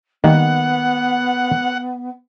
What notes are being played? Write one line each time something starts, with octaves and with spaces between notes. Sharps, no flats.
D#3 G3 A#3 B3 F#5